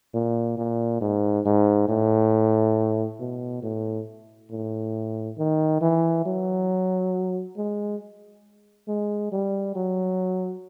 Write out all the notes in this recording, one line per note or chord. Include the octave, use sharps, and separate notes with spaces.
A#2
A#2
G#2
G#2
A2
B2
A2
A2
D#3
E3
F#3
G#3
G#3
G3
F#3